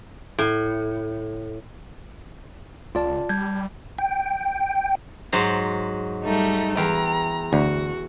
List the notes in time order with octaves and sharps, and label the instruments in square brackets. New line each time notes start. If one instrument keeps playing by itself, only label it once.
[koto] A2
[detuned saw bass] C#2 [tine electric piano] F4 D5 A5
[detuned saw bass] G3 [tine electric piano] A5 G6 G#6
[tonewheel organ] G5
[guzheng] G#2 F#3 C5
[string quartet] G3 A3 D#4
[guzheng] E2 G5 [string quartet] A#5
[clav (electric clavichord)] D2 [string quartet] F#4